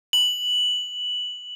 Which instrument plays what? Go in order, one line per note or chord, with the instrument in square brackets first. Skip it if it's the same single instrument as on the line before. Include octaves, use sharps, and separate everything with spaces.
[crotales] F#7